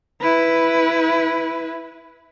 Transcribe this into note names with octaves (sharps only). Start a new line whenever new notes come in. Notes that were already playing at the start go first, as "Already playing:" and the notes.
E4 B4